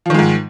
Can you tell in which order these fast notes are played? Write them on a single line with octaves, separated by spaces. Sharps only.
F3 D#3 G#3 G#2